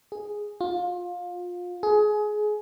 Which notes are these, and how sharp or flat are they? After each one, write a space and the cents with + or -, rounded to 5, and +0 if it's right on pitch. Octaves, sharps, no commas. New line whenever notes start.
G#4 +0
F4 +25
G#4 +25